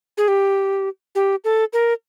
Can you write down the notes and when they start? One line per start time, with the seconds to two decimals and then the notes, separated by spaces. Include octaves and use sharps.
0.18 G#4
0.28 G4
1.15 G4
1.44 A4
1.73 A#4